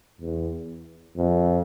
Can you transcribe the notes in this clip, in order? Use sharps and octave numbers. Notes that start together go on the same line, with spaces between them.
E2
F2